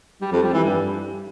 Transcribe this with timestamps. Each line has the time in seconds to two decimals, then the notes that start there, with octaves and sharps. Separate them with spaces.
0.21 G3
0.32 F2
0.43 G3
0.53 E3
0.64 G2